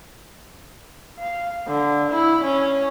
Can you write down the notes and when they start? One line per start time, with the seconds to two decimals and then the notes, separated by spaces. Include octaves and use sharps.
1.19 F5
1.67 D3
2.12 E4
2.44 C#4